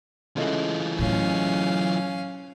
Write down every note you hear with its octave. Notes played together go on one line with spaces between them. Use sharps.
C#3 E3 G#3 A3 F4
A2 F#3 C#4 F5